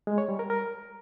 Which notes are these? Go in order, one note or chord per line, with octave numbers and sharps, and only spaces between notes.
G#3
C#5
G3
A#4
A#4